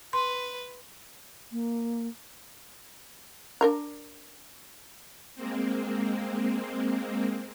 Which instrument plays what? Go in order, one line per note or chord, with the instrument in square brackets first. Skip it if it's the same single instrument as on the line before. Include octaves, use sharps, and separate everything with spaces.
[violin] B4 [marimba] C6
[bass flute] A#3
[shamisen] D4 A#4 A#5
[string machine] G#3 A#3 C4